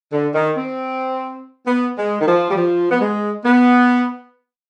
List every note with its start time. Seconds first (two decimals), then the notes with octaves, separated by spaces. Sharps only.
0.12 D3
0.34 D#3
0.57 C4
1.67 B3
1.97 G#3
2.20 D#3
2.27 F3
2.50 G3
2.56 F3
2.91 B3
3.00 G#3
3.44 B3